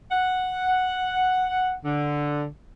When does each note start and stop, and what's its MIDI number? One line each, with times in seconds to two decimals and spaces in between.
0.11 1.72 78
1.84 2.45 50